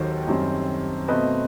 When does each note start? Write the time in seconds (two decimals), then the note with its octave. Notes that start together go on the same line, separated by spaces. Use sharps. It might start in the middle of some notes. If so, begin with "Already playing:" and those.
Already playing: D#2 D#3 F#3 A4 C5
0.27 F#2 D#3 G3 C4
1.08 B2 A3 C4 B4 D#5